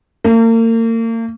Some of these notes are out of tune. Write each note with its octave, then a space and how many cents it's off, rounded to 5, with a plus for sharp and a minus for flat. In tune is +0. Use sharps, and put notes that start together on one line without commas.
A#3 -40